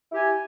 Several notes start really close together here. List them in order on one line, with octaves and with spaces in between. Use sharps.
E4 G4 G#5